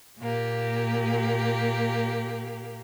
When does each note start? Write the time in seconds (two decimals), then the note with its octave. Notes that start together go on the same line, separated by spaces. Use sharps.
0.19 A#2 A#3 G4